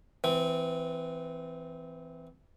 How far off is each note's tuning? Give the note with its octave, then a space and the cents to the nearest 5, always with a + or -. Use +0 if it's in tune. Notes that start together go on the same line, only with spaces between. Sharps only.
E3 +0 C4 -20